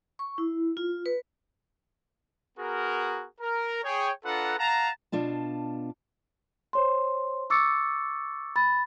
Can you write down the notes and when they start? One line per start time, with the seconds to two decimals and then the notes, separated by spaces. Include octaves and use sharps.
0.19 C#6
0.38 E4
0.77 F4
1.06 B4
2.58 B3 F#4 G#4 A#4
3.41 A#4
3.84 G#4 C#5 G5
4.24 D4 F4 A4 B4 F#5 A#5
4.58 F5 F#5 A5 A#5
5.12 B2 D4 F4 A5
6.73 C5 C#5 C6
7.50 C#6 D6 E6 A6 C#7
8.56 B5 A6